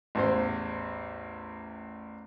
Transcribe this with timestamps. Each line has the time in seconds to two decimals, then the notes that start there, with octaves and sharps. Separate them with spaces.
0.15 A1 E2 C5